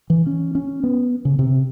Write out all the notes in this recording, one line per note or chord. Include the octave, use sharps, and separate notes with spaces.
E3
C#4
C#4
B3
C#3
C3